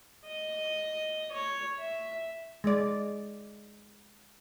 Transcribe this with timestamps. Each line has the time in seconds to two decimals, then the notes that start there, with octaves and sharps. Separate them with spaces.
0.25 D#5
1.31 C#5
1.81 E5
2.64 G#3 D5